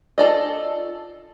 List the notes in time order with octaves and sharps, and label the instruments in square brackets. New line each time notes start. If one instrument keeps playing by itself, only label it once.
[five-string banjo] F4 A4 D5 D#5